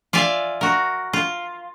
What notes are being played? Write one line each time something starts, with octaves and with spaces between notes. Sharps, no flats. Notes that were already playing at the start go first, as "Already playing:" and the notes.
F4 D5 E5 F5 G#5
F#4 A#4
F4